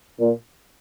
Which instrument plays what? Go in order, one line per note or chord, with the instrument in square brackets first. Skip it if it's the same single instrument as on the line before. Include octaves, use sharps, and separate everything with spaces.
[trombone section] A#2